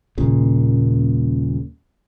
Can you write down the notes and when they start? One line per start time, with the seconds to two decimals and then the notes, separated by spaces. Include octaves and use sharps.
0.18 D#1 A#2 C#3